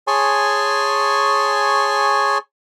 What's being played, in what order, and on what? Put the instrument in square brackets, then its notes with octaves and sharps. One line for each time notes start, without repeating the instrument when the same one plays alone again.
[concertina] G#4 C#5 G#5 A5 C6 C#6